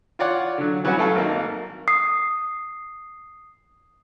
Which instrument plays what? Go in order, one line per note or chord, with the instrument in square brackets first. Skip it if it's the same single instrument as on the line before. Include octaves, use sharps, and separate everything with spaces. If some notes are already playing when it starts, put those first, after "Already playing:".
[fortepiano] F4 C#5 D5 F#5
D3 F#3
E3 F#3 G3 B3 C#4 F#4
E3 F#3 A3 A4 F5
G#1 A#3 D#4
[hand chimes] D#6 C7